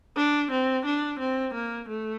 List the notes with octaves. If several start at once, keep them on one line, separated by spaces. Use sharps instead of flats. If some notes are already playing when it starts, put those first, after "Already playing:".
D4
C4
D4
C4
A#3
A3